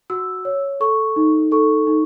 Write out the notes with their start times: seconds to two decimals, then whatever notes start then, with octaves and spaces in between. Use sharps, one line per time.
0.10 F#4 E6
0.45 C#5
0.80 A4 C#6
1.16 D#4
1.52 A4 C#6
1.87 D#4